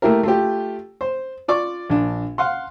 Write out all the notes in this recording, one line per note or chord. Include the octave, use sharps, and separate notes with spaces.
A3 A#3 E4 G4 A#4
A3 F4 G4
C5
F4 D5 C#6 D6
A#1 D4
F5 F#5 C6